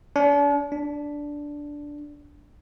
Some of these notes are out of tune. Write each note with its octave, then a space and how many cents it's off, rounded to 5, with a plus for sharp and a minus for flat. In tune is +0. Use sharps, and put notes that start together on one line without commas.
D4 -40
D4 -5